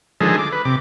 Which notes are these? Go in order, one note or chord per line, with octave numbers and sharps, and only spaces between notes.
D3 D#3 F3 G#3 G#4 A4
D6
B4
C3 D6